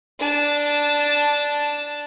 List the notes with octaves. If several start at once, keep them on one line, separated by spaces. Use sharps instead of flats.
D4 A5